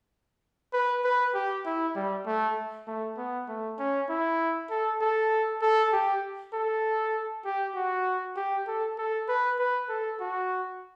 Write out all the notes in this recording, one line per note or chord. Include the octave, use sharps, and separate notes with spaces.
B4
B4
G4
E4
G3
A3
A3
B3
A3
C#4
E4
A4
A4
A4
G4
A4
G4
F#4
G4
A4
A4
B4
B4
A4
F#4